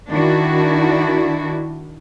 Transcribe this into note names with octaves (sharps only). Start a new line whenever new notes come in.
D#3 D4 E4 F#4